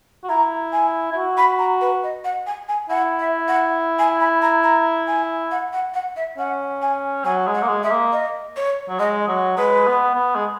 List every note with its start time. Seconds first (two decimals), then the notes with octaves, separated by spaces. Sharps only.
0.23 F#4
0.29 E4 A#5
0.72 G#5
1.12 E4
1.15 F#4
1.38 B5
1.59 A#5
1.81 B4
2.03 D#5
2.24 F#5
2.47 G#5
2.69 G#5
2.90 E4 F#5
3.19 E5
3.48 F#5
3.99 G#5
4.20 B5
4.42 A#5
4.64 A#5
5.08 G#5
5.51 F#5
5.73 F#5
5.94 F#5
6.16 E5
6.38 C#4 F#5
6.82 G#5
7.25 F#3 G#5
7.47 G#3
7.55 F#5
7.62 A#3
7.68 G#3
7.83 G#3 E5
7.91 A#3
8.12 D#5
8.56 C#5
8.89 F#3
8.99 G#3 D#5
9.28 F#3
9.57 G#3 B4
9.87 B3
10.15 B3
10.35 G#3